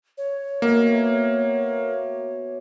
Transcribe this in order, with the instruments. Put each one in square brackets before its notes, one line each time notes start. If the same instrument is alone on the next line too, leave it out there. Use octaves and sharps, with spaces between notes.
[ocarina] C#5
[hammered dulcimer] B2 E5 [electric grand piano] A#3